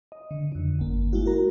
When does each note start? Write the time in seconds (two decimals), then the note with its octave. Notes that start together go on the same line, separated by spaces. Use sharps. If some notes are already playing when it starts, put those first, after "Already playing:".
0.12 D#5
0.31 D3
0.52 F2 D3
0.79 G1 A#3
1.13 G#3 E4 F#4
1.26 F#4 A#4 A#5